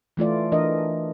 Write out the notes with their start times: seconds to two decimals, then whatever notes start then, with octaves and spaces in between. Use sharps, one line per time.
0.17 E3 A3 F4 D5
0.52 E3 D4 A#4 D#5